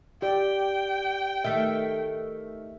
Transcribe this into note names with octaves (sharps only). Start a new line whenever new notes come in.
G4 D5 G5
D#3 A3 E5